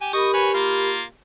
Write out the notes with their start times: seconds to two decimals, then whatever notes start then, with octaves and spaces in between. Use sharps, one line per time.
0.01 G4 G#5
0.13 G4 A#4 D#5 B5 C#6
0.34 B4 C#5 G#5
0.54 A#3 F4